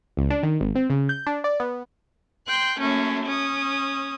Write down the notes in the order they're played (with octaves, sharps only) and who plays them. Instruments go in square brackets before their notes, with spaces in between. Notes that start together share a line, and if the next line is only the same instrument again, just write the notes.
[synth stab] C#2
D4
D#3
G#1
C4
C#3
G6
D4
D5
B3
[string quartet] G5 C6 F#6 G6
F#2 A3 A#3 C#4
C#4 D#6